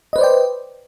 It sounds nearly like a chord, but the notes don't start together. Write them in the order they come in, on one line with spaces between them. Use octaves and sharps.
D#5 B4 C5 D5 G5